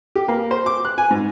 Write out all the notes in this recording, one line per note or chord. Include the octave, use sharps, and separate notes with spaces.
G4
A#3
C5
D6
F#6
G#5
G#2